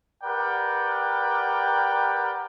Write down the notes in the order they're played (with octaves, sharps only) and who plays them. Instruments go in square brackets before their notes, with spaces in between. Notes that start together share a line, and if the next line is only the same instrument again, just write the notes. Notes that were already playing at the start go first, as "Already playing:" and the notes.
[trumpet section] G4 A#4 B4 D5 F#5 G5